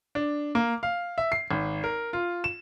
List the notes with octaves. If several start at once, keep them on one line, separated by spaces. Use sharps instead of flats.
D4
A#3
F5
E5
C7
G#1
A#4
F4
E7